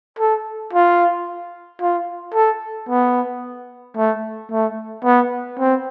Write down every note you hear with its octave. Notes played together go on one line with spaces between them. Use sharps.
A4
F4
F4
A4
B3
A3
A3
B3
C4